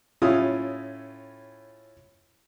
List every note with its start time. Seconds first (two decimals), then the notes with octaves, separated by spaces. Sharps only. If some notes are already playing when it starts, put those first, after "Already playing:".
0.22 A2 C#4 F4 E5 D#6